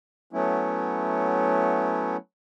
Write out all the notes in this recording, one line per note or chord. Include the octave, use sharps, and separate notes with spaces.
F#3 A3 B3 C#4 E4